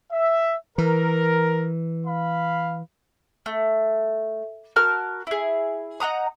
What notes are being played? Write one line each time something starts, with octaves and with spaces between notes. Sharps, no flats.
E5
E3 A#4
F5 B5
A3
F#4 A#4 A5 F6
E4 G#4
D#4 F#5 A#5 D#6